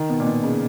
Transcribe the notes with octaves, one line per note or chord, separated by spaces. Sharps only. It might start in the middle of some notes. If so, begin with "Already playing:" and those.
Already playing: D#3
B2
A#2
B2
C#3